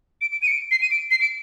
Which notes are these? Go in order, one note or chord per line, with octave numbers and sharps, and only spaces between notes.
D7
D7
D#7
C#7
D7
C7
D#7
D7
C7
D7